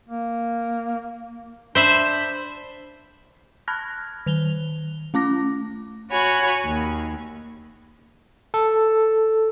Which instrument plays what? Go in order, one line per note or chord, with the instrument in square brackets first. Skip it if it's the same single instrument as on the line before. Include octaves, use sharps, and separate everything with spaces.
[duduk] A#3
[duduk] D4 [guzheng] C5 E5 B5
[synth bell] A5 B5 F6 F#6 G#6 A#6
D#3 F7 G7
A3 C#4 D6 A#6
[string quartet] F#4 C#5 G#5 B5
D#2
[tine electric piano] A4